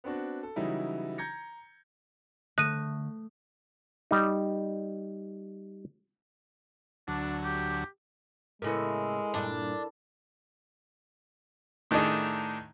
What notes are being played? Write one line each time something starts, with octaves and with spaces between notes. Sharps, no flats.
B3 C4 D4 F#4
A4
C#3 E3 F#3 G3 D#4 E4
A#5 G6 G#6 A#6 C#7
D3 A3 E5 D#6 F#6 D#7
G3 D#4
D2 F#3 D4
G4
A2 C#3 G#3 B3 E4 A4 A#4
G2 A#2 D4 D5
A2 D#3 A3 D4 D#4 G#4